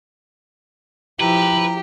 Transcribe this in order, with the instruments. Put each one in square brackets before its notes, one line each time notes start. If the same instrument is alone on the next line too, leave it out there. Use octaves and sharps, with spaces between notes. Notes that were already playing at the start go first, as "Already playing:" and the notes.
[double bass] F3 E4 [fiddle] G4 [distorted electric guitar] B4 [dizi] A#5